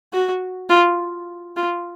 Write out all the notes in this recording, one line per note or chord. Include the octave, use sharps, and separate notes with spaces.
F#4
F4
F4